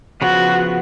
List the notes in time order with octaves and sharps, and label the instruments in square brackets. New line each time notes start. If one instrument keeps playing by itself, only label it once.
[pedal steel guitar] C#3 F3 B3 [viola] F#4